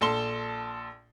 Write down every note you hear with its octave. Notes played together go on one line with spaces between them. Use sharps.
A#1 A4 A5 C6 G7